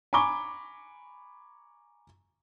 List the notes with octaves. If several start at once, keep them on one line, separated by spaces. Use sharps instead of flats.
G#5 A#5 B5 C#6 D6 G7